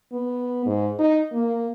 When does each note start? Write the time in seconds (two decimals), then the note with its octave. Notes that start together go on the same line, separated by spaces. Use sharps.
0.12 B3
0.66 G#2
0.99 D#4
1.33 A#3